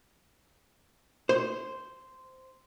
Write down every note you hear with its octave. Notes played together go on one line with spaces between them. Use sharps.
C5